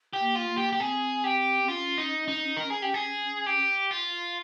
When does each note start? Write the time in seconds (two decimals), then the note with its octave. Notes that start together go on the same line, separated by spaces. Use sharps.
0.13 G4
0.20 A#3
0.35 F4
0.50 A#3
0.57 G4
0.73 G4
0.79 C4 G#4
1.24 G4
1.63 C4
1.68 C#4 F4
1.98 D#4
2.28 D#4
2.57 A#4
2.70 G#4
2.82 G4
2.94 G#4
3.46 G4
3.91 F4